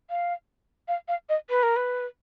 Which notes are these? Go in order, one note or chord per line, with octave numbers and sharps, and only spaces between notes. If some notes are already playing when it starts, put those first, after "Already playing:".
F5
F5
F5
D#5
B4
A#4
B4